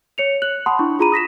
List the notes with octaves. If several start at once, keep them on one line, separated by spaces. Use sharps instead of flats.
C#5 C#7 F7
F#6 F#7
F#5 A5 B5 C6 D#6
D4 E4 C#6
F4 G#4 A#5 B5 D#7
D#6 A#6 B6 E7